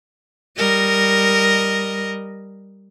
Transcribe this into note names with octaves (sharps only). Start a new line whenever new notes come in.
G3 A#4 D#5